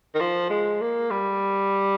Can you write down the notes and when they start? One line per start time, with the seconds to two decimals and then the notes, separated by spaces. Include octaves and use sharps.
0.15 D#3
0.20 F3
0.50 G#3
0.81 A#3
1.10 G3